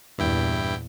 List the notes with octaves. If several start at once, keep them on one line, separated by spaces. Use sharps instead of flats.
E2 G2 A#2 E4 G5